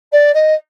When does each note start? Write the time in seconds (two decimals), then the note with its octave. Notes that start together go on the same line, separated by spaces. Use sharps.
0.12 D5
0.34 D#5